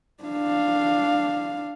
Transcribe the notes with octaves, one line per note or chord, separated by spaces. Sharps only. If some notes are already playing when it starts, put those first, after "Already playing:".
D4 F5